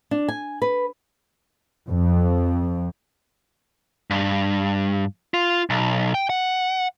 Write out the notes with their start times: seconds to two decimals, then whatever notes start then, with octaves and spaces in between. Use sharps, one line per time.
0.11 D4
0.28 G#5
0.62 B4
1.88 F2
4.10 G2
5.34 F4
5.70 B1
6.14 G5
6.30 F#5